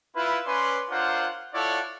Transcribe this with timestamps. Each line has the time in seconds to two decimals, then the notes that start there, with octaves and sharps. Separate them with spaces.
0.14 E4 F4 B4
0.45 C#4 B4 C#5 D5 C6
0.90 D4 F4 A#4 C5 C#5 F#5
1.53 E4 F4 A4 C#5 D5 F#5